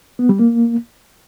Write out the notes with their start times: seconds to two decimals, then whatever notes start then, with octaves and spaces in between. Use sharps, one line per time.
0.19 B3
0.29 G3
0.39 A#3